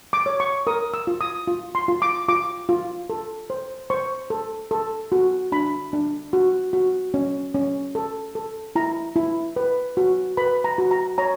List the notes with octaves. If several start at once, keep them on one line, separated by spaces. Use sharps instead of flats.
D6
C#5
C#6
A#4 D#6
E6
F4
D#6
F4
C6
F4
D6
F4 D6
F4
A4
C5
C5 C#6
A4
A4
F#4
D4 B5
D4
F#4
F#4
C#4
C#4
A4
A4
E4 A#5
E4
B4
F#4
B4 B5
A#5
F#4
A#5
C#5 A#5